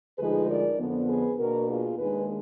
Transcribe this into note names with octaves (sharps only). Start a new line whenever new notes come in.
D2 D3 F3 G#3 D#4 G#4 B4
A#4 D5
F2 D3 F3 B3
G#4 B4
B2 A#3 D4 F#4 A#4
F4 G#4
D#2 D#3 G#3 D4 G#4 B4